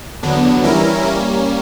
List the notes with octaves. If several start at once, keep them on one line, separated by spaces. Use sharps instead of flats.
E2 D3 F#3 B3 D4
E3 G3 C#4 E4 A#4
G3 A#3 C#4